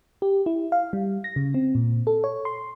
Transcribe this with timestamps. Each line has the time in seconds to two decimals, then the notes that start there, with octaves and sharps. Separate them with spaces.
0.22 G4
0.46 E4
0.72 F5
0.93 G3
1.24 A#6
1.36 C#3
1.54 C4
1.75 A#2
2.07 A4
2.24 C#5
2.45 C6